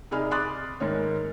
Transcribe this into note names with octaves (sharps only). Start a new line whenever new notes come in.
C3 D#4 G#4 D5 B5 F6
B5 C6 D6 D#6 F#6 A6
G#2 D#3 A#4 C#5